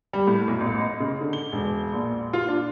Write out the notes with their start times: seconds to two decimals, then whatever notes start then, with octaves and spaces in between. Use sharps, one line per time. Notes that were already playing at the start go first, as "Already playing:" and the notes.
0.13 G3
0.27 A2
0.48 B1
0.60 A1
0.80 D#5
1.00 C#3
1.21 D3
1.33 G7
1.52 E1
1.93 A#1
2.33 F4
2.48 D4